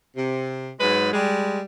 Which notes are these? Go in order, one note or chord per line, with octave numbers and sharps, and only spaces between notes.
C3
G#2 F#3 G#3 B4
G3 G#3